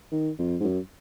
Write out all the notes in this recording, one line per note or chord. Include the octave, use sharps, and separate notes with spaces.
D#3
F2
G#2
F#2